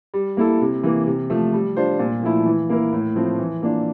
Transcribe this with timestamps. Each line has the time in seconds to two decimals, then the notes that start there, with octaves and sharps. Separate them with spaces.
0.14 G3
0.37 A#3 E4 A4
0.61 C3
0.83 E3 A#3
1.07 C3
1.30 F3 A3
1.53 G3
1.76 D4 F4 C5
1.99 A#2
2.23 F3 A3 E4
2.46 E3
2.69 A#3 E4 A#4
2.93 A2
3.16 F3 A3 C4
3.39 E3
3.63 A#3 D4 F4